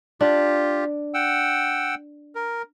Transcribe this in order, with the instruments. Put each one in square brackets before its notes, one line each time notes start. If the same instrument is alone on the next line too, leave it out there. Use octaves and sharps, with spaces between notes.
[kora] D4 [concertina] F4 G4
[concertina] F#5 G5 E6
A#4